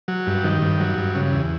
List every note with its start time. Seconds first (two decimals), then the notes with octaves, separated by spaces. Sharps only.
0.08 F#3
0.27 G2
0.44 D#3
0.62 G2
0.80 F#3
0.98 G2
1.15 C#3
1.33 E2